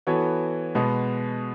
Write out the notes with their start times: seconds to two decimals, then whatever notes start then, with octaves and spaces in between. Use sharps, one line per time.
0.07 E3 B3 F#4 A4 C#5
0.75 B2 G#3 B3 F#4